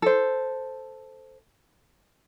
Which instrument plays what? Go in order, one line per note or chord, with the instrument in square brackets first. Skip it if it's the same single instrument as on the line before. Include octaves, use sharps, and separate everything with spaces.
[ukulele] A4 C5